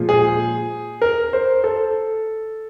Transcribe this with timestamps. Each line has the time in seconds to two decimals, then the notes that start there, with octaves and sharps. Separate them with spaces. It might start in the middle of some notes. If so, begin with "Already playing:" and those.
Already playing: A#2 F3 G#3
0.09 G#4
1.02 A#4
1.33 C5
1.64 A4